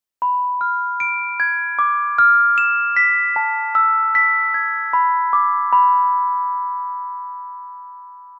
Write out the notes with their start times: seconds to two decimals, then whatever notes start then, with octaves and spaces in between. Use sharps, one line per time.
0.22 B5
0.61 F6
1.00 D7
1.40 G#6
1.79 D6
2.18 F6
2.58 E7
2.97 B6
3.36 A5
3.75 E6
4.15 B6
4.54 G#6
4.93 B5
5.33 D6
5.73 B5